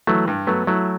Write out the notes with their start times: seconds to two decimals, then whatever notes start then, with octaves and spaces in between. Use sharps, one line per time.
0.07 E3 F#3 A3
0.28 G2
0.47 F#3 A3 B3
0.67 F#3 A3 E4